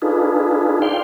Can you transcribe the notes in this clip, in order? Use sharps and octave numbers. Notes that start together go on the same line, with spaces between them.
D4 D#4 F4 G#4 A4 B4
D5 F5 G5 C6